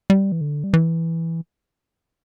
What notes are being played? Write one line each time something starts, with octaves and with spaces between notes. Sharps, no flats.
G3
E3
D3
G3
E3